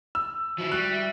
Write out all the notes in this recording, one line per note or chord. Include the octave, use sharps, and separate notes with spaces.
E6
F3 E4 F#4
G3 F#6
E5